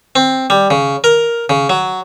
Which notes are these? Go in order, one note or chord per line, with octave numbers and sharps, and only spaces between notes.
C4
G3
C#3
A#4
C#3
F#3